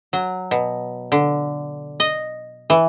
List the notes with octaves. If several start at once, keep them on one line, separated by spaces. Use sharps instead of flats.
F#3
B2
D3
D#5
E3